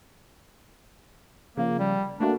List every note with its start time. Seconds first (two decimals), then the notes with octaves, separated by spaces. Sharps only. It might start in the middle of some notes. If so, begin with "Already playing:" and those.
1.57 C#3 F3 A#3
1.79 G3
2.20 A3 A#3 D4 F#4